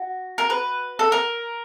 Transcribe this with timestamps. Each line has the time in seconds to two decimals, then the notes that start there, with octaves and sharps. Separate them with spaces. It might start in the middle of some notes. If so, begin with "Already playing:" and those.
Already playing: F#4
0.38 A#4
0.50 B4
0.99 A4
1.12 A#4